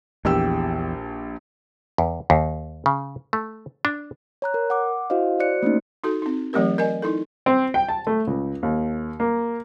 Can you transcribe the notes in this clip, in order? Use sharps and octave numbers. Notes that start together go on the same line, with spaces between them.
A#1 E2 G4 E6
E2
D#2
C#3
A3
D4
C#5 A#5 F#6
A#4
F#5 D6
E4 F#4 C5 D#5 F5
F#4 C5 D5 F#6 C#7
A3 A#3 C#4 D#4
D#4 F#4 A4
C4 D#4
E3 F#3 A3 C4 G4 A#4
A#4 D5 D#5 G#5
D#4 E4 A4
C4
G5
A5
A3
C#2
D#2
A#3